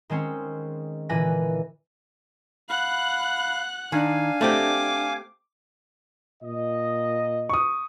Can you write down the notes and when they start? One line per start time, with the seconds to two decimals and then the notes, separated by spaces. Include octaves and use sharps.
0.10 D#3 G#3 C4 C#4
1.09 A#2 D3 E3 B4 G#5 A#6
2.69 F5 F#5 B5 F#6
3.92 D#3 D4 F5 G#5
4.41 A3 C4 G4 D6
6.43 A#2 D#5
7.49 C#6 D#6